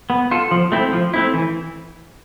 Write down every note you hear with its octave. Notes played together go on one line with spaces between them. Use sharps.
B3
F4 A4
F3
A3 C4 E4
F3
A3 C4 E4
E3